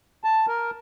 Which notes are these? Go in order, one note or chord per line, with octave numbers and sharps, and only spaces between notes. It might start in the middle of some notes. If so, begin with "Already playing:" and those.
A5
A#4